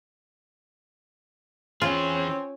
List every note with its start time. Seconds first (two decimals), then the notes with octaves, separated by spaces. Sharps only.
1.81 E3 C4 C#4 F4 G#4